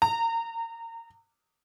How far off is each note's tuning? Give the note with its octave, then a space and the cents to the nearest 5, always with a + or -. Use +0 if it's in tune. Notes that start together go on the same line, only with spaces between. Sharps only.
A#5 -25